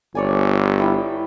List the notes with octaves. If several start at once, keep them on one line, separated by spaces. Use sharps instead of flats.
G1 C#5 D5 G#5
E4 G5